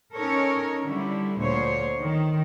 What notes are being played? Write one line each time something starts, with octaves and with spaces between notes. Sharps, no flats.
C#4 D#4 A4 A#4 C#5
D3 G3 E4
D2 A#2 C5 C#5
D#3